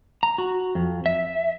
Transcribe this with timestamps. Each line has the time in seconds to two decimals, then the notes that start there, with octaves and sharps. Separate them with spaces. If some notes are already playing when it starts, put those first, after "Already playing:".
0.23 A#5
0.38 F#4
0.75 F2
1.06 E5